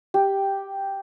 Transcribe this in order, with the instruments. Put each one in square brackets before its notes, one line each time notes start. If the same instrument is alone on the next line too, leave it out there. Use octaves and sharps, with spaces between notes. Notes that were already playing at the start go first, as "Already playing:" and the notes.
[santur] G4